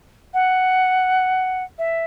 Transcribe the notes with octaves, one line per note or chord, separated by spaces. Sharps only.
F#5
E5